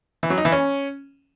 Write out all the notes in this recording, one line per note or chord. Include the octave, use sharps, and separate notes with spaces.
E3
F#3
D#4
E3
C#4